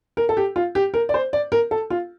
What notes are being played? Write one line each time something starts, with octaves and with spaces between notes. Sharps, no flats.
A#4
A4
G4
F4
G4
A#4
D5
C5
D5
A#4
A4
F4